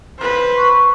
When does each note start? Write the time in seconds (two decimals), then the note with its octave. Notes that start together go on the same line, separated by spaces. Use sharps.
0.18 B4 C5
0.57 C#6